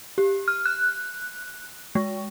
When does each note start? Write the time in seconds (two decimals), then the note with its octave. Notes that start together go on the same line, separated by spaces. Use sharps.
0.18 G4
0.48 F6
0.66 F#6
1.95 G#3